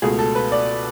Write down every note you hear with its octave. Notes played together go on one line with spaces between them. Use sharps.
C#2 B2 A3 G#4
A4
B4
D5